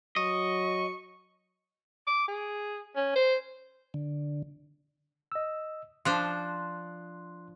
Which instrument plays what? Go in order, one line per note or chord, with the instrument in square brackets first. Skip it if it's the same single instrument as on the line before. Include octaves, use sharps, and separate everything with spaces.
[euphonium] F#3 [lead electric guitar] D#5 [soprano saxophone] C#6
[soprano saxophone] D6
G#4
C#4
C5
[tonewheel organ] D3
[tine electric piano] D#5 E6
[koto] F3 D4 C5 [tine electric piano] C6 F#6